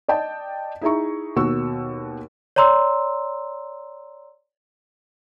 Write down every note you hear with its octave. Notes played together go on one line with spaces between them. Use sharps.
D5 D#5 G5 A5
D#4 E4 G#4 E5 A#5 C#6
D#2 B2 F#4 C#6 E6
C#5 D5 A#5 C6 E6